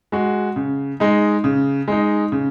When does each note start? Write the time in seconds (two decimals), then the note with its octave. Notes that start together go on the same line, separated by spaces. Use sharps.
0.12 G#3 F#4
0.56 C#3
1.00 G#3 D#4
1.44 C#3
1.88 G#3 D#4
2.32 C#3